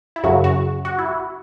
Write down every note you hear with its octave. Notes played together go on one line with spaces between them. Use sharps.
E4
F#2 C#3 F#3 F#4
F#4
F#4
E4
F#4